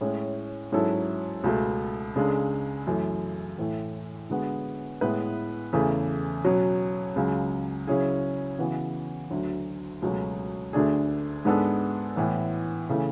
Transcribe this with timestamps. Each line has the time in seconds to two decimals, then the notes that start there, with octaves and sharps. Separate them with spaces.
0.01 A2 G#3 C#4
0.72 G#2 F#3 C#4 E4 A4
1.44 C#2 B2 A3
2.15 C#2 C#3 G#3 D4 A4
2.87 F#2 E3 A3
3.58 A2 E3 A3
4.30 D3 G#3 B3 F#4
5.01 A2 G#3 B3 E4 B4
5.73 E2 C#3 E3 A3
6.44 B2 F#3 C#4
7.16 C#2 C#3 F#3
7.87 C#3 F#3 C#4 E4 G#4
8.59 C#3 E3 B3 F#4
9.30 D2 D3 F#3
10.02 C#2 B2 F#3 A3 C#4
10.73 D2 D3 A3 D4 G#4
11.45 G#2 G#3 B3 D4 A4
12.16 A2 E3 B3
12.89 C#3 E3 A3